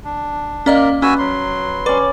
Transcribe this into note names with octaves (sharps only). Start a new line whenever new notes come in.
D4
A#3 C#4 A#4 D5 D#5
C#4 F#4 B4 G#5 E6
F#3 C6
C#4 B4 D5